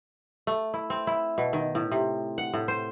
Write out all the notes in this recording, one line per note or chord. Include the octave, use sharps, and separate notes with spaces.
A3
E4
C4
E4
B2
D#3
A2
C3
F#5
A2
C5